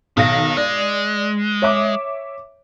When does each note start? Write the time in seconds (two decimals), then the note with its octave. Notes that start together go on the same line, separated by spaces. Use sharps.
0.17 B1 D#3 F5 A#6
0.57 G#3 D5
1.62 C#5 E5 D6